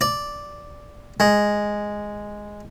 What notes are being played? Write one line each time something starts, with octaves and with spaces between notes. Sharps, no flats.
D5
G#3